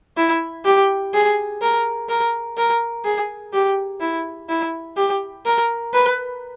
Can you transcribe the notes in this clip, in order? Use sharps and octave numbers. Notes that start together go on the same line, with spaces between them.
E4
G4
G#4
A#4
A#4
A#4
G#4
G4
E4
E4
G4
A#4
B4